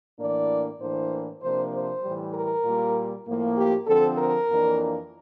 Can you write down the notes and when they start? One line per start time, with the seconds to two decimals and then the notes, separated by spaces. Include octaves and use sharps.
0.19 A2 E3 A#3 D4 D5
0.80 A2 E3 A#3 D4 C5
1.42 C3 F3 A#3 D4 C5
1.72 C5
2.03 A2 E3 G3
2.34 A#4
2.64 A#2 G3 A#3
3.26 A2 F3 A#3
3.56 G4
3.87 D3 F3 C4 A4
4.18 A#4
4.49 F2 E3 A#3 D4